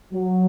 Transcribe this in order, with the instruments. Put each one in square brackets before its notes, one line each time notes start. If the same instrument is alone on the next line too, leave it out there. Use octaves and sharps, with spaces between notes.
[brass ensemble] F#3